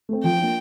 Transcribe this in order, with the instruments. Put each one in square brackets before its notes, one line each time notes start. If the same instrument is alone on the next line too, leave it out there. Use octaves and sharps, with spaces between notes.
[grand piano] A3 C4
[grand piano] F3 [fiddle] G5
[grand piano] A#3 D4 F4